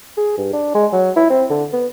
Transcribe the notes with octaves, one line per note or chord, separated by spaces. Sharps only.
G#4
G2
D4
G#3
F#3
E4
C4
D3
B3